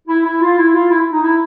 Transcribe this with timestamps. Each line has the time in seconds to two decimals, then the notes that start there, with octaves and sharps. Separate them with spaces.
0.08 E4
0.25 E4
0.42 F4
0.58 E4
0.74 F4
0.90 E4
1.12 D#4
1.23 E4